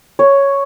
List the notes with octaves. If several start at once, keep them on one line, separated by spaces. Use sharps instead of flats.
C#5